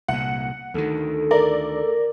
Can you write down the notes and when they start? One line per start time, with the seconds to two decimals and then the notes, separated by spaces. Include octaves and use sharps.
0.08 C2 A#2 F#5
0.74 D2 D#3 A4
1.31 A#4 D5